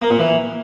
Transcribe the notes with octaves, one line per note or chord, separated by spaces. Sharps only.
A#3
A#2
E3